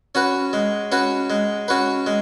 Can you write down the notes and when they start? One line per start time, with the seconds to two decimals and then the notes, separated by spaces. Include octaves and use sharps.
0.15 C#4 F#4 B4
0.53 G#3
0.92 C#4 F#4 B4
1.30 G#3
1.68 C#4 F#4 B4
2.07 G#3